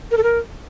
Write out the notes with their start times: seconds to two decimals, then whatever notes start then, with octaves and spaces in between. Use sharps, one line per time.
0.11 A#4
0.17 A4
0.23 A#4